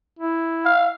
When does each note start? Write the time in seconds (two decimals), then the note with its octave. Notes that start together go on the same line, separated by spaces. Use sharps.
0.19 E4
0.65 F5